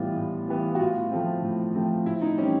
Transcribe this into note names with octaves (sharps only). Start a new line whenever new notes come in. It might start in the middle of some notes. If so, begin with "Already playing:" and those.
Already playing: A2 E3 G3 B3 F4
A2
E3 G3 B3
F#4
A2 F4
F3 A3 C4
A2
F3 A3 C4
A2 E4
D#4
E3 G3 C4 C#4